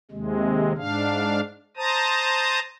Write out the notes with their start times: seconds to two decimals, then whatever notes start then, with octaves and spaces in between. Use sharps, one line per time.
0.11 D#2 C3 G#3
0.77 G#2 D4 F5
1.77 C5 A5 A#5 D#6